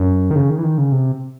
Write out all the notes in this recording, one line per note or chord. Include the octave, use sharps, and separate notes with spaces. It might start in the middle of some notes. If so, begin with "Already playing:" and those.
Already playing: F#2
D#3
C#3
D#3
E3
D#3
C#3
C3